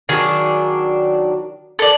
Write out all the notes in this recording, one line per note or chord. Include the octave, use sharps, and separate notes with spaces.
D#3 F#3 D4 G#4
A4 D5